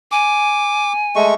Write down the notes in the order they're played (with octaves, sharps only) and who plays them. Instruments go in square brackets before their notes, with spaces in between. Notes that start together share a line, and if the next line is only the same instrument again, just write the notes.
[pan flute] G#5 [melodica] D6
[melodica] G#3 A3 C#6